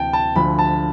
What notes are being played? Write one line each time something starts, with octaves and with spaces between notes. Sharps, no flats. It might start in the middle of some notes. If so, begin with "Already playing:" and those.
Already playing: D2 C3 E3 G5 A5
A5
D2 D3 F3 B5
A5